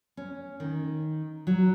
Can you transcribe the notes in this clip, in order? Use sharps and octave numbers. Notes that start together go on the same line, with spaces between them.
C#4
D#3
F#3